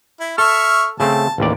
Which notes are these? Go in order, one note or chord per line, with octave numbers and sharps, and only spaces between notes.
E4
A4 E5 C#6 F6
C#3 A3 C4 A5
A1 D#2 D5